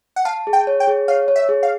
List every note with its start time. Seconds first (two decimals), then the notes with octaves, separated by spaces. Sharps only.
0.16 F#5
0.25 F5 A5
0.47 G#4
0.53 G5
0.67 C#5
0.80 G5
0.87 G#4
1.08 C#5 F5
1.28 C#5
1.36 E5
1.49 G#4
1.63 F5